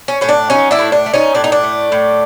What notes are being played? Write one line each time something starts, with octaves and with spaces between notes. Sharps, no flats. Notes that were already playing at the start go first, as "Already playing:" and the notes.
C#4
A2 C#4
D4
F#3 C#4 D#4
D4 E4
A2
D4
A3
C#4 D#4
A2 D4
D#4
D4
A3
A2